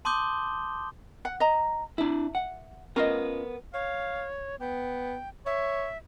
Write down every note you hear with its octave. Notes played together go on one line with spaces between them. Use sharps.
A5 C6 D6 D#6 G6 G7
F#5
D#5 A#5
D4 E4 E5
F#5
B3 C#4 F4 A#4 D#5
C#5 F5
B3 G5
C#5 E5